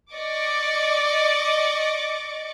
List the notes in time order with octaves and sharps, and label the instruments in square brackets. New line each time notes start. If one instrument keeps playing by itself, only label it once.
[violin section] D5 D#5 C#6 D6